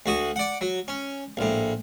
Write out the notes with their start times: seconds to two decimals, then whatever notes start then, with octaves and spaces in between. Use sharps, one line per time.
0.06 D2 F#4 D#6
0.36 D5 F#5
0.61 F#3
0.88 C#4
1.37 A#1 A2